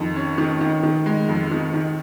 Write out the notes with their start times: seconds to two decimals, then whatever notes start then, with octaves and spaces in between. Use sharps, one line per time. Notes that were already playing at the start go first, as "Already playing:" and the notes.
Already playing: F2 D#3
0.16 C#4
0.38 D#3
0.61 D#3
0.83 D#3
1.06 G#3
1.28 F2
1.51 D#3
1.74 D#3